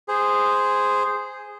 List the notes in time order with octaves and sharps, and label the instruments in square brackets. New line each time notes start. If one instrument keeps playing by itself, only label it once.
[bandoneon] G#4 C5